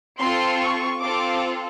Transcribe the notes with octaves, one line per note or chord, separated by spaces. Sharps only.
C4 F4 A4 C6
C#6
C4 F4 A4 D6